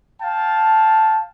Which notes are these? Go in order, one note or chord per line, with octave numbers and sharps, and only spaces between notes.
F5 G5 A5